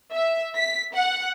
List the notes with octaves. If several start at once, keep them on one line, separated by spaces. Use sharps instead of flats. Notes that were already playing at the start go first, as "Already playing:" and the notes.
E5
B6
F#5